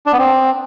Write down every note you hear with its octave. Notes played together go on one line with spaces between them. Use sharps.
D4
B3
C4